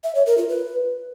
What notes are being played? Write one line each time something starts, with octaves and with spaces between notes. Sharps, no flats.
E5
C#5
A#4
F4
B4